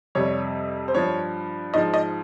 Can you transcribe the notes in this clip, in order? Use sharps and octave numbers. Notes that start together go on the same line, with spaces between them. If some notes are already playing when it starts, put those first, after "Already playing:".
F2 C3 G3 C#5
C5
G2 F3 C#5
G#2 F3 D#5
D#5